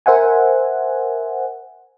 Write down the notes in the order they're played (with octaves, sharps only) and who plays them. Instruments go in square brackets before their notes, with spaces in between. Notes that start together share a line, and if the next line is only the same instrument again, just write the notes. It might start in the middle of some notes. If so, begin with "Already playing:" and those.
[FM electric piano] A#4 C5 E5 F#5 G#5